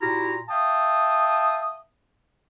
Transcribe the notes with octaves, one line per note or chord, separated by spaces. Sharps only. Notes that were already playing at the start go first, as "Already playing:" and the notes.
A#2 E4 F#4 G4 A#5
E5 F5 G5 A5 D#6